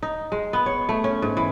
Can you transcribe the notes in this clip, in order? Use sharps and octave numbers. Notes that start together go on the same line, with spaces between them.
D#4
G#3
B3
C#5
A3
C#4
G#2
E3